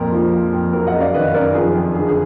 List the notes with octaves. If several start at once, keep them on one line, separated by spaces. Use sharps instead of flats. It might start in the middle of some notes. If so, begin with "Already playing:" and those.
Already playing: F2 A#2 A#4
F3
F3
F2
F#3 A#4
D#5 F#5
F#2
D5 F5
D#3 B4 D#5
F#2 A#4 D5
F3 G#4 B4
F2
D3 G#4
G#4